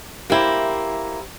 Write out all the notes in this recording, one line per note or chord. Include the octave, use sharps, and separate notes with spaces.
A#3 E4 G4 C5 G5